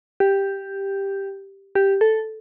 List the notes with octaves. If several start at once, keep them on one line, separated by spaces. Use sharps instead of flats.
G4
G4
A4